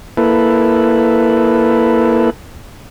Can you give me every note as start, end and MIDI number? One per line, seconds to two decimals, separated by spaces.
0.17 2.30 58
0.17 2.30 64
0.17 2.30 69
0.17 2.30 71